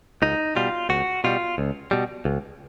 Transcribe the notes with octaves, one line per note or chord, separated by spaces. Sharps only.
C#2 D#4
B2 G3 F4
C#2 F#4
B2 G3 F4
C#2
B2 G3
C#2